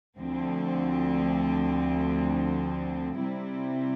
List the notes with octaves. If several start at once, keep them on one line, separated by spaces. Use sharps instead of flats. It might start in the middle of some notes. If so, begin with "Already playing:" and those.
D2 D3 F3 C4
C3 G3 C4 E4